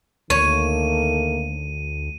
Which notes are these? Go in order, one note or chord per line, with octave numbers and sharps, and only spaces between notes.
D2 D#3 A3 A#3 C#5 D#7